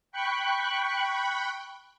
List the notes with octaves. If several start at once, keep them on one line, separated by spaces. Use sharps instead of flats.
G5 B5 C#6 F#6